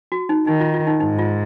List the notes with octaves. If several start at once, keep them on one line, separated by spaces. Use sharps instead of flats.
F#4
D#4
D#3 D#4
F4
F4
D#4
G#2 D#4
F4